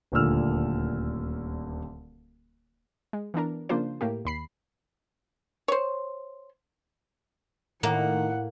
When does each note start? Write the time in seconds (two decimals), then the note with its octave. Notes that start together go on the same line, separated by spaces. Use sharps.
0.12 D#1 D2 A#2 D3 E6 F6
3.13 G#3
3.34 E3 B3 D4 A#4
3.69 C#3 F3 A#3 D4 F4 C5
4.01 A2 A#3 G4
4.25 D#2 B5 C7
5.68 C5 C#5
7.83 A2 D#3 A#3 F#5